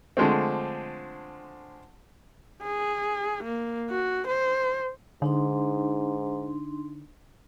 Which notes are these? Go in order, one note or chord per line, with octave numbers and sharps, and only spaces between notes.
D3 F3 G#3 A3 C4
G#4
A#3
F#4
C5
G#2 D3 D4 D#4 C6